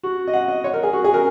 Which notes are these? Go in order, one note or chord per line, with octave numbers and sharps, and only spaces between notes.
F#4
D#5
F#5
D#5
C#5
A#4
G#4
F#4
G#4
A#4